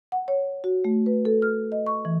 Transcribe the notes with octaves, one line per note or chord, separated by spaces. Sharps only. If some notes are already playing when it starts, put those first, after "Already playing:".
F#5
C#5
F#4
A3
B4
A4
F6
D#5
C#6
E3